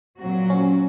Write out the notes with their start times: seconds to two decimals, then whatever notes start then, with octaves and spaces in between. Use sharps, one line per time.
0.18 A#2 F#3 C4 F#4
0.50 C#4